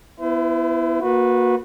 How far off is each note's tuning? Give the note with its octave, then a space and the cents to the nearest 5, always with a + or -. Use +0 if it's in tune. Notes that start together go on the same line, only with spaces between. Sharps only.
B3 +0 E4 +15 C5 -45
A#3 +15 F#4 -25 B4 +0